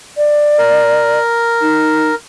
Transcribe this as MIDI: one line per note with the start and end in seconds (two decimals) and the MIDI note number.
0.17 1.19 74
0.58 2.15 70
1.61 2.10 63